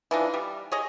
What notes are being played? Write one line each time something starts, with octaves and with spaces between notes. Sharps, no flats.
E3 F3 D4 D#4
G3
G#4 C#5 D#5